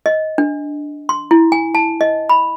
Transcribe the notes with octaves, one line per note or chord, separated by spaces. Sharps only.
D#5
D4
C6
E4
G#5
A5
D#5
B5